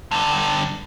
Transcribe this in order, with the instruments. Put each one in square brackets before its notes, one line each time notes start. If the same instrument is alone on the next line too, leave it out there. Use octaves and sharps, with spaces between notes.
[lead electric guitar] G2 D3